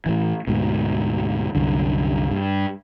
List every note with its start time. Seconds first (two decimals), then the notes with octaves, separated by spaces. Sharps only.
0.06 A2 E3
0.47 D2 G#2 B2
1.55 C2 F#2 D3
2.31 G2